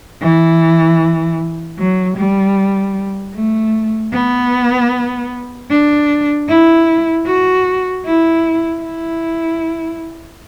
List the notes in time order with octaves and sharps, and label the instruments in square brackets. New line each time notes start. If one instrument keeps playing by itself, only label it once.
[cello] E3
F#3
G3
A3
B3
D4
E4
F#4
E4
E4